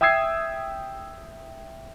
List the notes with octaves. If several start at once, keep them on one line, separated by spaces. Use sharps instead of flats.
E5 G5 D#6 E6 G#6 C7